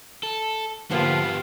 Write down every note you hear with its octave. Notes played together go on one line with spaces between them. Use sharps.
A4
D3 F3 A#3 B3 F4 G4 B4